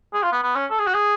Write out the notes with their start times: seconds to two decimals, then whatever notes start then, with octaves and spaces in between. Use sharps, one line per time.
0.14 G#4
0.23 F4
0.32 B3
0.43 B3
0.56 C#4
0.71 A4
0.79 G#4
0.87 F#4
0.94 G#4